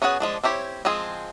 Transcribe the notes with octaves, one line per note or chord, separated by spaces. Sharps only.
B3 C#4 F#4 G#4 F#5
F3 G#3 D4
C4 E4 G4 C#5
F3 G#3 C4 G#4